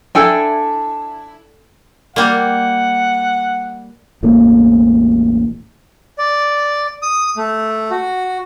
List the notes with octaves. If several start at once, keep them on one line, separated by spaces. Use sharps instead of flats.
D4 E4 A4 G5 G#5
G3 A#3 F#5
E1 A1 A2 A#3
D5
D#6
A3
F#4